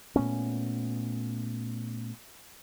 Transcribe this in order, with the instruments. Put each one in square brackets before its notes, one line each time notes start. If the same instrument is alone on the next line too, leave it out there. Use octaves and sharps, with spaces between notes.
[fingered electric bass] A#2 A3 B3 C#4